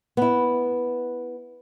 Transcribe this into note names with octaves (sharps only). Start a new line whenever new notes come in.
B3 E4